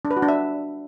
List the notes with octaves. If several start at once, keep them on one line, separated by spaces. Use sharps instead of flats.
D4
B4
F#4
D4
E5